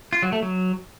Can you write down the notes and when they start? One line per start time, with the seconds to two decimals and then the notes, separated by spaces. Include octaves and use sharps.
0.13 F4
0.23 F#3
0.32 A3
0.42 F#3